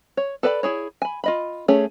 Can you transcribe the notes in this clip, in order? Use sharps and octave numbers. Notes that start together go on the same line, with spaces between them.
C#5
A4 B4 D5 F#5 B5
E4 G#4 C#5
G#5 B5
F4 D#5 B5
A3 C#4 G#4 C#5